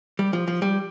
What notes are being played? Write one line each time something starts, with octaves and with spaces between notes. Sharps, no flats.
G3
F3
F3
G3